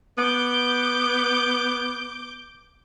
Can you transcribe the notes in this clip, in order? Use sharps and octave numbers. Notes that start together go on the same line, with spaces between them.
B3 D6 G6